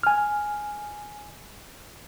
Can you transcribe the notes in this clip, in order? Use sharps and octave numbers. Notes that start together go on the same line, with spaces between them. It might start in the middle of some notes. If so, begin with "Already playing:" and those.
G#5 F6